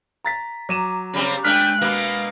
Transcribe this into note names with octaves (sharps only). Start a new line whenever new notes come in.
A#5 A6 B6
F#3 A#5 D6 D#7 E7
C#3 G3 C4
G#3 A3 D4 G5 F6 F#6
B2 A#3 B3 F5